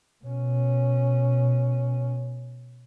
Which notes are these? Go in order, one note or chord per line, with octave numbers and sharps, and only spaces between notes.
B2 C#4